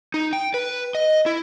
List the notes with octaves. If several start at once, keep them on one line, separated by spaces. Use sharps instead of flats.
D#4
G5
B4
D#5
E4